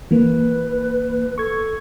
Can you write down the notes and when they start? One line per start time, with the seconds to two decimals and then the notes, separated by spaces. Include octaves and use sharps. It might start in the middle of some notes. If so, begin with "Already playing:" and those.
0.11 E3 A#3 B4
1.38 A4 C#6 G#6